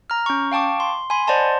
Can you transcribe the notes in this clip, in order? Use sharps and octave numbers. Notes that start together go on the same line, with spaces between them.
A#5 F6
C#4 C#6
F5 G5 A5 C#6 D6
C6
G#5 B5 C6
C5 D5 D#5 F#5 A5 C6